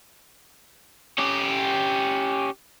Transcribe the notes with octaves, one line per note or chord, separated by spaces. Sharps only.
C#4 G4